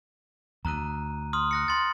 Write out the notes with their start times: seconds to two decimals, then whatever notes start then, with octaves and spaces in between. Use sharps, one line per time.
0.65 D2 A#5 F#6 D#7
1.33 C6 D#6 F6
1.51 F#6 A#6 C#7
1.68 B5 C6 A6